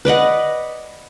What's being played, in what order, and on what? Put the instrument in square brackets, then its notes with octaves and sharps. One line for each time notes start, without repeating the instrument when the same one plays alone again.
[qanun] B4 D5 D#5 F#5